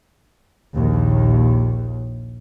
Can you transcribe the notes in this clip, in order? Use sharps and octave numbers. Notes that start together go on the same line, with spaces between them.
A#1 D#2